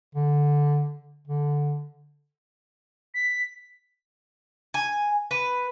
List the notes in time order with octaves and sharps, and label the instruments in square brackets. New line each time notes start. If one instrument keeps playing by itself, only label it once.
[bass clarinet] D3
D3
[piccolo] B6
[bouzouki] G#5
B4